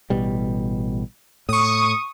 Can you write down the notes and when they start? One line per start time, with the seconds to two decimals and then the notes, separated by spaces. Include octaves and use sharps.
0.10 A1 B2 G3
1.49 A2 C#6 D#6